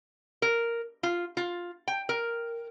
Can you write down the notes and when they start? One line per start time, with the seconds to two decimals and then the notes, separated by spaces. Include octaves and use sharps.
0.42 A#4
1.03 F4
1.37 F4
1.88 G5
2.09 A#4